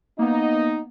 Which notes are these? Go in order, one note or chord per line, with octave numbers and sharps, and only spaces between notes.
A#3 B3 D#4